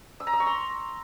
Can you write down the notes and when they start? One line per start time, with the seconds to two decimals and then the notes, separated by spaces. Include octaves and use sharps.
0.20 E6
0.27 A#5
0.33 E6
0.40 C#6
0.47 C6